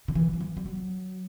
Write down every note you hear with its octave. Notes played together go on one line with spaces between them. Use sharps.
D3
E3
F#3
E3
G3
F#3